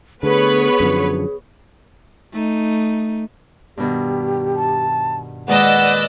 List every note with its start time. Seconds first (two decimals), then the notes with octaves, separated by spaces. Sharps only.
0.23 D3 A3 B3 G#4 B4 C#5
0.80 F#2 D3 F3
2.32 A3 D#4
3.77 G2 B2 D#3 G4
4.56 A5
5.48 A#2 D#3 G#3 B4 D5 D#5 F#5 E6